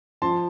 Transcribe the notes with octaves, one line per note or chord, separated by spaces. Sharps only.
F3 A5 C6